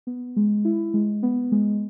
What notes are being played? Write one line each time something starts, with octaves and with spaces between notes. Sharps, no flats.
B3
G#3
E4
G#3
B3
G#3